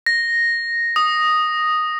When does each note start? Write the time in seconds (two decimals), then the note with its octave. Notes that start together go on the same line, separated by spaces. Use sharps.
0.06 A#6
0.96 D#6